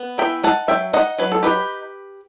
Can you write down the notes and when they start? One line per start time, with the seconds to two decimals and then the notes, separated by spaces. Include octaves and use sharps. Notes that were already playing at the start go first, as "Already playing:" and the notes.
Already playing: B3
0.18 E3 E5 G5
0.44 D#4 F#5 A5
0.68 F#3 E5 G5
0.93 D#4 D#5 F#5
1.18 F#3 B4
1.32 A4
1.43 D#4 G4 B4